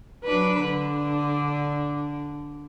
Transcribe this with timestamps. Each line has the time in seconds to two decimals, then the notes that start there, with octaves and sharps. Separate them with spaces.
0.24 F#3 D4 B4
0.62 D3 D4